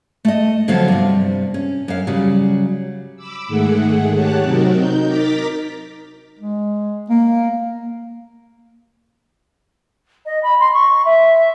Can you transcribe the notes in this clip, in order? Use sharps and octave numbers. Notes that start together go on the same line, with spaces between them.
A3 D#5
D3 F3 F#3 B3 F5
G2 C3
C#4
F#2 F5
C#3 F#3 G3
B5 D6 E6
G#2 D#3 A3 G#4 F#5
D#3 G4 C#5 F#5 A5 F#6
C3 F#3 C4 D#4 F#4 A#4
D#4 G6
D#4 A#4 A#5 D6 A6 B6
G#3
A#3
D#5
B5
C6
C#6
E5